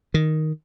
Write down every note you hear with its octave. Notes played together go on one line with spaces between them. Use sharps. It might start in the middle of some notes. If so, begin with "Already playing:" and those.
D#3